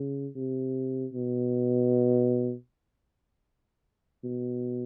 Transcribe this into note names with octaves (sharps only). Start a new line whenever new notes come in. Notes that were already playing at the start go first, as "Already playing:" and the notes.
Already playing: C#3
C3
B2
B2